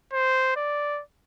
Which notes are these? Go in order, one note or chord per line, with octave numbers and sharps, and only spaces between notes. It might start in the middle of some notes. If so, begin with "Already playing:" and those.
C5
D5